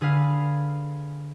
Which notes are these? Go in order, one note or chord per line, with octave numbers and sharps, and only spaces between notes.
D3 G#4 B4 F5